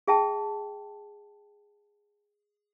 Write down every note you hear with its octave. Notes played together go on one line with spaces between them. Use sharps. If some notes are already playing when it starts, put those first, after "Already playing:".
G#4 E5 G5 A5